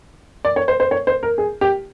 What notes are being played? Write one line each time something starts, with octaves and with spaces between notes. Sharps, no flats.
D5
C#5
C5
C5
C#5
C5
A#4
G#4
G4